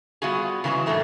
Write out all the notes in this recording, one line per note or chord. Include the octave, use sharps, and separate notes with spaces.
G3 B3 F4 F#4 G#4
C#3 E3 F#3 G#3 C4
G#2 D3 E3 F#3 A3 A#3